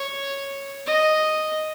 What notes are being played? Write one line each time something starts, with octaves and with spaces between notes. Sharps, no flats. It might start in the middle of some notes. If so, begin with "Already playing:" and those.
Already playing: C#5
D#5